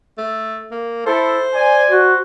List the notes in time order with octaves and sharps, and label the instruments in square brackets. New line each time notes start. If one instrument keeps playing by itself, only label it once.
[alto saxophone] A3
A#3
[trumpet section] E4 A4 [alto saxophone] C5
[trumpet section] D5 G#5
[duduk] F#4 [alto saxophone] C5